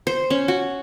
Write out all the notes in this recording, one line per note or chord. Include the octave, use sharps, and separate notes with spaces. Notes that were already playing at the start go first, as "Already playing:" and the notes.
C5
C#4
F#4